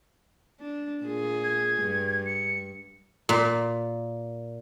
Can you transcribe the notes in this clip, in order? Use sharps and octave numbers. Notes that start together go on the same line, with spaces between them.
D4
A#2 G#4
G#6
G2
C#7
A#2